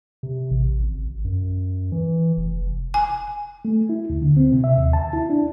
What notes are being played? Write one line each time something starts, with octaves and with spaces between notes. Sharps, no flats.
C3
A1
G#1
F#2
E3
F1
G#5
A3
E4
D2
D3
C4
C3
E5
D#2
A5
E4
D4